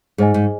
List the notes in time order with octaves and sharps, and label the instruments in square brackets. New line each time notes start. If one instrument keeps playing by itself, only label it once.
[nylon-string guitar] G#2 [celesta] G#4 C5 D#5 G#5
[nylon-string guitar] G#2